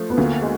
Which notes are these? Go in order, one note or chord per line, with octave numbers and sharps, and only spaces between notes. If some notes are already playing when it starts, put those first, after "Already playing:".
Already playing: F3 A3
B3
D2 A#3
G#3